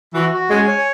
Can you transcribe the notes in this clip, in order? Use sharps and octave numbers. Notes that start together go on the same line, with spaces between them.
E3 F#4
F#4
G#3 C#4 G#5
C#5